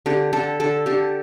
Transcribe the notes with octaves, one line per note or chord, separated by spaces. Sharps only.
D3 G4
D3 A4
D3 A4
D3 G4